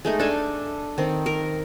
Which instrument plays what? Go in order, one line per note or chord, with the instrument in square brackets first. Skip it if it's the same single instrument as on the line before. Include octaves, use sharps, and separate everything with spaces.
[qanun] G#3 A3 D#4
D4 A4 G#5
D#3 C4
A#4